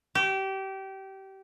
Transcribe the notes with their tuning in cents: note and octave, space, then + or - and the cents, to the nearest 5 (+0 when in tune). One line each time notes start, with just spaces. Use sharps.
G4 -25